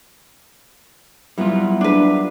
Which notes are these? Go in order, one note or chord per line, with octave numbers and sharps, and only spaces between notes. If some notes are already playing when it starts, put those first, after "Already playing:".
F#3 G3 B3 E4 F4
D4 B4